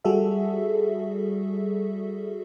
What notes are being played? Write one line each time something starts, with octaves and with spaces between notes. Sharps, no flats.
G3 F#4 G#4 A4 E5